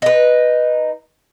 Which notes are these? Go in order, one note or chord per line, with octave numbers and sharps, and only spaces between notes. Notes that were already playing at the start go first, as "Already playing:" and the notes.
D#4 B4